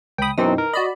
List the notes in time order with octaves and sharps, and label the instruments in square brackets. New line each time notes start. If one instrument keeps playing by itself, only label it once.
[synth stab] C#2 D#6 [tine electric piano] G5 B5
[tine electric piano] F#2 B2 C4 [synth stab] E3 D#4
[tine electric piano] A#4
[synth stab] F#4 D5 B5 [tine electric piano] D#5